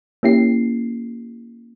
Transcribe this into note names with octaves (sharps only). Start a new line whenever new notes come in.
A#3 C#4 E4 G4 C7